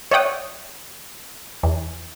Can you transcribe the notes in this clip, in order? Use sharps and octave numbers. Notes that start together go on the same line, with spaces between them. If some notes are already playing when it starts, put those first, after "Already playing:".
C#5 D5 E5 F#5 G5 D#6
E2